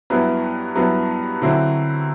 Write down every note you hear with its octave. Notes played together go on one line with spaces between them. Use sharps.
G2 F#3 B3 E4
G2 F#3 B3 E4
D3 F#3 C4 E4